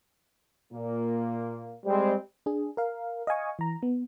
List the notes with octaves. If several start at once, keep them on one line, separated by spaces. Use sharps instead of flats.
A#2 A#3
G3 G#3 C4
D4 G#4
A#4 F5
D#5 F5 G#5 C#6
E3 A#5
B3